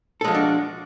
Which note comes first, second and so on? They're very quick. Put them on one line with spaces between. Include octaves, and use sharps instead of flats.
A4 G#3 F3 F#4 D4